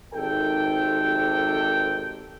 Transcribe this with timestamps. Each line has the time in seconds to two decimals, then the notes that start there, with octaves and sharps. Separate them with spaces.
0.14 G#1 C3 D#3 A4 G5